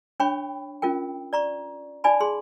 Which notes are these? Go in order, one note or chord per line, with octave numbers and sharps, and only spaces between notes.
D4 C#5 G5 B5 C#6
C#4 F4 A#4 G5
D5 A#5 C#6
D#4 D5 G#5 B5
G#4 C6